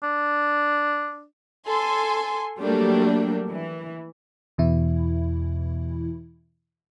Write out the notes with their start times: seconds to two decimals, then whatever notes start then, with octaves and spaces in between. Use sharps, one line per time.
0.03 D4
1.67 A4 G#5 C6
2.60 F#3 G3 A3 A#3 D4
3.48 E3
4.58 E2 B2 E3 E4